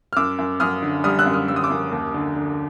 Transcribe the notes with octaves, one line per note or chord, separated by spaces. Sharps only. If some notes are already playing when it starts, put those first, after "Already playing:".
F6
F#2 D6 E6
F#2
F#2 D#6 F6
D3
G3 D#6 F6
E6 F#6
F#2
D#6 F6
G3 E6
D#6
D6 E6
F#2
D#2
D3
D3